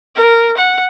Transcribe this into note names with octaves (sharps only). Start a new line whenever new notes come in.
A#4
F#5